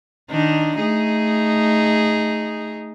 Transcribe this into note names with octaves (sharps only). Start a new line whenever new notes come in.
D#3 D4 D#4
A3 D#4 G#4